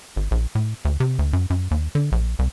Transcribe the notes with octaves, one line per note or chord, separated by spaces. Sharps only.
G#1
A#1
A2
D2
C3
D2
F#2
F#2
D#2
D3
A#1
C2